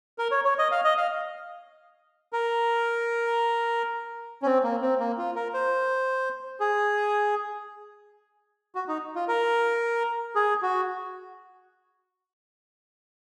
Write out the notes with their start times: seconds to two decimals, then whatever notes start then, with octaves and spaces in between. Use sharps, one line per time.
0.18 A#4
0.31 C#5
0.45 C#5
0.59 D#5
0.71 F5
0.84 D#5
0.98 F5
2.33 A#4
4.42 C#4
4.46 C4
4.64 A#3
4.82 C4
4.99 A#3
5.18 F4
5.36 A#4
5.54 C5
6.60 G#4
8.75 F#4
8.88 D#4
9.15 F4
9.28 A#4
10.35 G#4
10.62 F#4